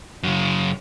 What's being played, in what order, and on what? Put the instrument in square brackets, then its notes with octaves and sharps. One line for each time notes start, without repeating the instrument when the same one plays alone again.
[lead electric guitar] F#2 C#3